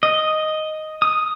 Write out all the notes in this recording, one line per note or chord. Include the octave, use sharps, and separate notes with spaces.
D#5
D#6